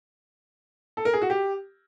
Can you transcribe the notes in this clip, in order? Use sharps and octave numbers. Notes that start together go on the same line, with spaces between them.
A4
A#4
G#4
F#4
G4